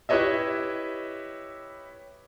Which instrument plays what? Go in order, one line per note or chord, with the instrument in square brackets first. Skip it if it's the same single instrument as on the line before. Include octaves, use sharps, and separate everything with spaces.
[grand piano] E4 G4 B4 C#5 D#5 E5